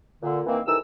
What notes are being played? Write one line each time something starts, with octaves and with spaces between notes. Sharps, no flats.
A#2 D3
D#3 E3 A#3 C4
C2 D#3 E3 A4 E6